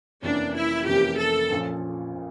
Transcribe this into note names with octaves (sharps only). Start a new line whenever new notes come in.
F1 F2 E3 A#3 C#4 D4
E4
F1 F2 E3 A#3 C#4 G4
A4
A#1 A#2 F3 C#4
A#2